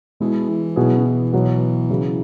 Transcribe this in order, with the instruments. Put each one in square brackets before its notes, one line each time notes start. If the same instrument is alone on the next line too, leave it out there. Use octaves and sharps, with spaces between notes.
[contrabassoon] B2 [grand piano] G#3 E4 G#4
[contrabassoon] E3
[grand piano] B2 B3 E4 G#4 [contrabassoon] F#3
[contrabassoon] C#3
E3
[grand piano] B2 F#3 B3
C#3 F#3 E4